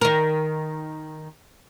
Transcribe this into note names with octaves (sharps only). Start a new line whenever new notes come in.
D#3 A#4